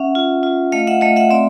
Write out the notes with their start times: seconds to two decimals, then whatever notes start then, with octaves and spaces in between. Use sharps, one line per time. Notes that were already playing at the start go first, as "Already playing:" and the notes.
Already playing: C#4 E5 F#5
0.15 F4
0.43 F4
0.72 A3 D#5 F5
0.87 E5 F#5
1.01 A3 D#5 F5
1.16 E5 F#5
1.30 C4 D5 E5